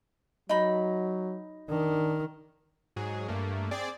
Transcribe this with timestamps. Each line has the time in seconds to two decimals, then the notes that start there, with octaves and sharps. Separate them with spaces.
0.49 F#3 D#4 B5
1.69 D#3 D4
2.96 G#2 F#3 G#4
3.28 G2 A3 A#3
3.71 C4 G#4 D5